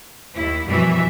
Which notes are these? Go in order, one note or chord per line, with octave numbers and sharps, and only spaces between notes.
D#2 E4
F#2 B2 E3 F3 G3 E5